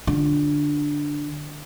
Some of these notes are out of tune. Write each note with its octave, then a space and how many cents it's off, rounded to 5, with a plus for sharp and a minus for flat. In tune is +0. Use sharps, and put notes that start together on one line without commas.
D3 +0 F4 +15